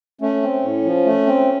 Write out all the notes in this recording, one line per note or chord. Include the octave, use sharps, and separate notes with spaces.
A3 C#4
C4
A2
F3
A3
C4